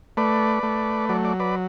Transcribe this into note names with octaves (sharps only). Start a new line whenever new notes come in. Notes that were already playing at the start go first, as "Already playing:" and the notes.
A3 B4 D5
A3
F#3 D5
D5
B4 D5